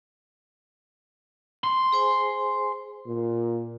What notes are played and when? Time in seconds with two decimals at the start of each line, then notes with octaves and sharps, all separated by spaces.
1.64 C6
1.92 G#4 C5 G#5
3.06 A#2